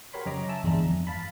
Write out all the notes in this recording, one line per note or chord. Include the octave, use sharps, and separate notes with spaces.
F#4 G4 A#4 C#5 B5 C6
F#2 C#3 C#5 D#5 A#5 D6
E5 G#5 A5 E6
G1 E2 G#3 D4 E5 A#5
F2
F5 A5 B5